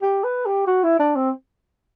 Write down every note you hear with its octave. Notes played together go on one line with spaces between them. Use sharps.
G4
B4
G4
F#4
E4
D4
C4